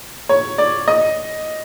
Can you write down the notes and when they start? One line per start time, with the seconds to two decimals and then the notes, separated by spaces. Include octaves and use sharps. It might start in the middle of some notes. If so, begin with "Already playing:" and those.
0.29 C#5
0.58 D5
0.88 D#5